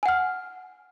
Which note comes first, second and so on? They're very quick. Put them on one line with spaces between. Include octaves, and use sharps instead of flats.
G#5 F#5 F6